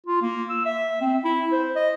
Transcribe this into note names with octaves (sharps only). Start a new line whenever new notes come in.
F4
A#3
E6
E5
C4
E4
C5
D#5